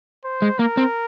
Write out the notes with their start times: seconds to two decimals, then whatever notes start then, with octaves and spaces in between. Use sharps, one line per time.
0.25 C5
0.42 G#3
0.59 A#3 A#4
0.77 C4